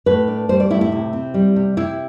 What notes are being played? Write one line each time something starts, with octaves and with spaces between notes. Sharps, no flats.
A2 B4
D4
G3 C5
D5
A2 E4
E4
C3
C4
G3
C3
C3 E4